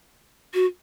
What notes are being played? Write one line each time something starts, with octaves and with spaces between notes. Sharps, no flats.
F#4